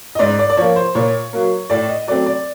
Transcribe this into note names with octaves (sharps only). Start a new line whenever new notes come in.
D#5
G#2 D5
D5
D5
F3 A#3 C#5
C5
A#2 C#5
F#3 A#3
A2 D5
D#5
F#3 A3 C4 D5
D5